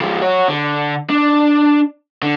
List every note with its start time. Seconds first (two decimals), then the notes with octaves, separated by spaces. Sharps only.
0.01 F3 G#3
0.22 F#4 C#5
0.48 D3
1.10 D4
2.23 D3